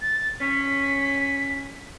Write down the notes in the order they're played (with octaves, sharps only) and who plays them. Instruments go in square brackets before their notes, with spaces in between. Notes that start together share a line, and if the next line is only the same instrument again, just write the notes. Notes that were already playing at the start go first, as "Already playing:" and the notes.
[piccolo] A6
[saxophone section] C#4 [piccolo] B6